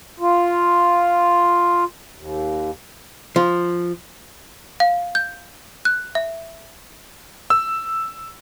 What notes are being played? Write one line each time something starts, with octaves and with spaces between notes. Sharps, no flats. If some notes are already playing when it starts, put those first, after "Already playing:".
F4
D#2
F3
F5
G6
F#6
E5
E6